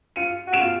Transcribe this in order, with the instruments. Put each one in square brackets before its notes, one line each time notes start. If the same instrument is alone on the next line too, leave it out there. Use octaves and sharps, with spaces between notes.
[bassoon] F4 [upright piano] C#7 D#7
[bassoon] F#4
[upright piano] D7 E7
[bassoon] F4